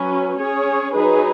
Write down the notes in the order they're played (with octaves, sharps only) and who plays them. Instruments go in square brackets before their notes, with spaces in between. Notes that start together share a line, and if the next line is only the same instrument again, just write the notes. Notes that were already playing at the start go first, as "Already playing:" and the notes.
Already playing: [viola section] F#3 C#4 B4
C#4 G#4 C#5
F#3 D#4 G#4 B4